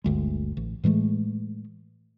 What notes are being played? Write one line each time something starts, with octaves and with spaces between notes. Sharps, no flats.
G1 D2 G#3
A1
A2 E3 G#3 A3